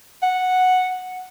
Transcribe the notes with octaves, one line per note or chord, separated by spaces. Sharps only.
F#5